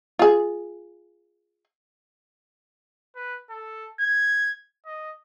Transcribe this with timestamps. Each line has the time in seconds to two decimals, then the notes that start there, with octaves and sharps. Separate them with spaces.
0.19 F4 G#4
3.16 B4
3.50 A4
4.00 G#6
4.86 D#5